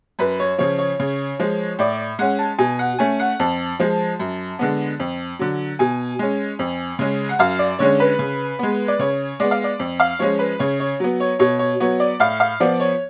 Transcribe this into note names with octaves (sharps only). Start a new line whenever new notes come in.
F#2 B4
C#5
C#3 F3 C#5
C#5
C#3
F3 G#3
A2 D5
G#3 C#4 F#5
A5
B2 G#5
F#5
A3 C#4 G#5
F#5
F2 A5
F3 G#3
F#2
D3 G#3 B3
F2
D3 F#3
B2 G#5
G#3 C#4
F2
C#3 G#3 C#4
F#5
F#2 F5
D5
D3 G#3 C#4 C#5
B4
C#3
G#3 B3
D5
C#3 C#5
G#3 B3 D5
F5
D5
F2
F5
F3 G#3 C#4 C#5
B4
C#3 C#5
C#5
F#3 B3
C#5
B2 C#5
C#5
F#3 B3 C#5
D5
A2 F5
F5
F3 B3 D5
C#5